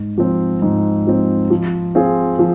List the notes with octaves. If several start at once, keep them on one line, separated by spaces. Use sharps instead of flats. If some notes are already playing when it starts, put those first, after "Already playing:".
Already playing: G#2
F3 C4
G#2
F3 C4
F3
C4 F4 G#4
F3